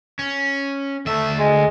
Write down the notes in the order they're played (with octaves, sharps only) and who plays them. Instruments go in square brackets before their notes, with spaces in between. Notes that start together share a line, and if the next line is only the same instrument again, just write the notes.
[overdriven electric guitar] C#4
[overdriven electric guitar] D2 E5 [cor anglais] A3
[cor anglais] G#3